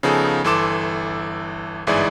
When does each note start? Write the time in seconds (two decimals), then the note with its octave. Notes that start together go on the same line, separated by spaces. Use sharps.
0.03 C#3 F3 B3 D#4 G#4 A4
0.44 G1 E3 A4 C6 D6 E7
1.87 G1 G#2 E3 E4 G#4 D5